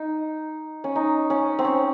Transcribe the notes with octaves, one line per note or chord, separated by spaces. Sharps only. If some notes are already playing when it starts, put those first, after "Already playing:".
Already playing: D#4
C#4
D#4
C#4
C4
C#4